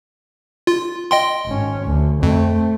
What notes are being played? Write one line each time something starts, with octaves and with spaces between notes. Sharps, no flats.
F4
D#5 G5 C6
G#1 C#4
D2
F2 A3 C4